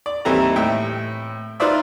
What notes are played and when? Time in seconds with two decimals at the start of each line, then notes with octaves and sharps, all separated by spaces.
0.06 D5
0.25 D#2 E3 G3 C4 A4 A#5
0.56 A2 E5 G5
1.60 D#4 F4 B4 C5 D5 E5